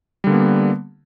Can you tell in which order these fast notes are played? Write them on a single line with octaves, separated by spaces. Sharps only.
G3 D3 A#3 B3